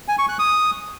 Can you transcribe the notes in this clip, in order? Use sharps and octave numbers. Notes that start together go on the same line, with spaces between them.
G#5
C#6
F#6
D#6